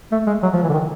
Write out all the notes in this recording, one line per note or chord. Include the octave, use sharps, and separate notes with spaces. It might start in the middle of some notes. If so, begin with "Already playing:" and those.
A3
G#3
F#3
F3
E3
D3
D#3